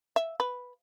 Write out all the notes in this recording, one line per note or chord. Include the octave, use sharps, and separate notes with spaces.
E5
B4